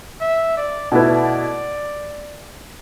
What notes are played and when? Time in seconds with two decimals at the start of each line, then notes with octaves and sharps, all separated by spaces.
0.21 E5
0.57 D5
0.92 B2 A3 E4 B4 D5